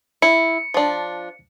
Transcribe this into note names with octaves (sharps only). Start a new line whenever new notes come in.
E4 C#7
F3 D4